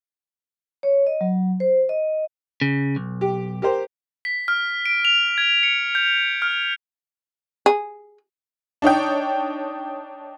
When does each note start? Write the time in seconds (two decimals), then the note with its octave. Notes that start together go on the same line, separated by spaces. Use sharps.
0.83 C#5
1.07 D#5
1.21 F#3
1.60 C5
1.89 D#5
2.61 C#3
2.96 B1
3.21 G4
3.62 G4 A#4 C5
4.25 B6
4.48 F6
4.86 D7
5.05 F7
5.38 G#6
5.63 C#7
5.95 G6
6.42 F6
7.66 G#4
8.82 D4 D#4 C#5 G5